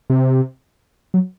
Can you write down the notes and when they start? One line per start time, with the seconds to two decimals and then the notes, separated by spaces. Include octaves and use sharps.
0.10 C3
1.14 F#3